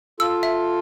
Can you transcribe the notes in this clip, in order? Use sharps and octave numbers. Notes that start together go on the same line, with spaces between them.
F4 A4 E6
E5